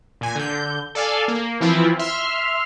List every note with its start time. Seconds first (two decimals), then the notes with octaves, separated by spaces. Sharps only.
0.21 A#2 G#5
0.35 D3 G6
0.95 A4 D5 F5 G#5
1.28 A#3
1.61 E3 F3 C4 E4 F4
1.99 E5 C6 F6